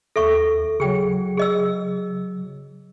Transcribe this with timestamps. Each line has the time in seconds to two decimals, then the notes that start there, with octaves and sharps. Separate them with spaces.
0.16 D#2 A4 E5 C#6 A#6
0.80 C#3 F#3 G#4 G5
1.37 G#4 D#5 E6